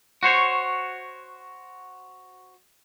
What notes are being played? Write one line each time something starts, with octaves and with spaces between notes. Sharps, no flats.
F#4 C5 C#5